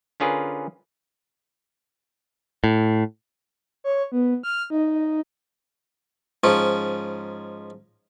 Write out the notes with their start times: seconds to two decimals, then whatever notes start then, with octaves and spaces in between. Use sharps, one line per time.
0.20 D3 C#4 F4 G#4 A#4 B4
2.64 A2
3.84 C#5
4.12 B3
4.43 F6
4.70 D#4
6.44 G#2 F3 C#4